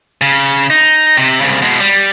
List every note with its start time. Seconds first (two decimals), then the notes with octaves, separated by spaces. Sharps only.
0.22 C#3
0.70 D#4
1.18 C3
1.41 C2 C#3
1.62 B2 G#3
1.81 G3